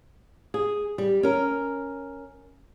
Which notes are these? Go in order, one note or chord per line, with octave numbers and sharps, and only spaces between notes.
G#4
G3
C#4 A#4